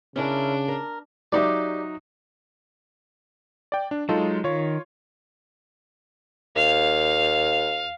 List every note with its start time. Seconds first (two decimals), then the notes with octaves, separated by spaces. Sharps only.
0.16 C#3 C#4 D4 E4 A#4
0.68 A#4
1.32 F#3 D#4 G4 D5 E5
3.72 D5 G5
3.91 D4
4.09 F#3 G#3 D#4 F4 A4
4.44 D#3 F4 C#5
6.56 D#2 F5